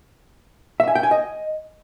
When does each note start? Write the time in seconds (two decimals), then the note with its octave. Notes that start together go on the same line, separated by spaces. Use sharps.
0.80 E5
0.88 G#5
0.95 G5
1.03 G#5
1.11 D#5